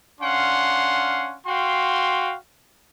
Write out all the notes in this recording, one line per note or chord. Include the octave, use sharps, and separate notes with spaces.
C#4 D4 F5 F#5 C6
F#4 F5 G5 C6